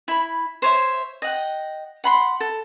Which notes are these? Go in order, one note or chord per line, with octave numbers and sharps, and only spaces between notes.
E4 B5
C5 C#5 E5
D#5 F#5 G5
F#5 B5 C6
A4